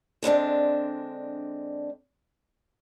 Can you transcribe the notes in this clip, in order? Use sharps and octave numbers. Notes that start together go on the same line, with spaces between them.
D3 G#3 C4 D4